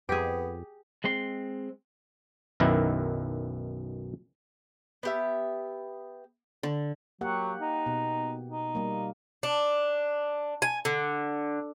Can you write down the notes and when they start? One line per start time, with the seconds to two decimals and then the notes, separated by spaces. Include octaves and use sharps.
0.09 F2 B3 G4 G#4
1.04 G#3 C4 C6
2.60 B1 F#2 B2 D#3 E4
5.03 B3 G4 E5
6.63 D3
7.21 F#3 A#3 G4 F#5
7.61 D#4
7.86 B2
8.49 D#4
8.75 G3 A#3
9.43 D4
10.62 G#5
10.85 D3